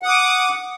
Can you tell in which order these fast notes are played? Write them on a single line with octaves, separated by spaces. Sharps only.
F#5 D#6 D6